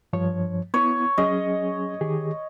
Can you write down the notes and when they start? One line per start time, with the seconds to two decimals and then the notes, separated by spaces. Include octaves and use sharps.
0.13 G2 F3 C#5
0.74 B3 E4 C#5
1.18 F#3 C#4 G#4 D#5
2.01 D#3 G4 G#4